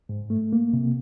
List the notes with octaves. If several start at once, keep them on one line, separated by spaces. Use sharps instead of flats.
G#2
A3
A#3
C3